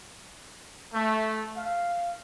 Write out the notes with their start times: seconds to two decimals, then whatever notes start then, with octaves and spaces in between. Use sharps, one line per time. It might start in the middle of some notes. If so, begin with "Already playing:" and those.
0.94 A3
1.56 F5